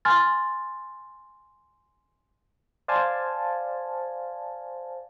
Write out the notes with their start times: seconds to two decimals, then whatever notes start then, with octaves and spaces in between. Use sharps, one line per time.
0.05 G#5 C6 F6 A6
2.88 C5 D5 F5 G#5 A5